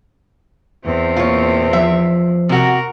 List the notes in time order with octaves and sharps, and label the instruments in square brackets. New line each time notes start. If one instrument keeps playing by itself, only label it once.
[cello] E2 C4
[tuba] A#2 [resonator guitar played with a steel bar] F4 C#5
[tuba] F3 [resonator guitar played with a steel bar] E5
[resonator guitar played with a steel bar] C3 F#4 [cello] A#4